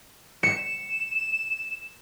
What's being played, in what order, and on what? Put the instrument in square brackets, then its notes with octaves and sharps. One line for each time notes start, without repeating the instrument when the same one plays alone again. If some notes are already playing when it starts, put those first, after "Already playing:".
[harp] C#7 [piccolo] E7